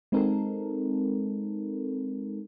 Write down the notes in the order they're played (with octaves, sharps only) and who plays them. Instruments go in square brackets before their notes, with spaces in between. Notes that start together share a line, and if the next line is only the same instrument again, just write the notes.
[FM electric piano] G#3 C4 D#4 A4 A#4